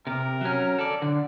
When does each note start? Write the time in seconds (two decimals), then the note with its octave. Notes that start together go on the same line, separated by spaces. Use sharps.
0.07 C3 A#4
0.41 F#3 C#4
0.79 A4 D5
1.02 D3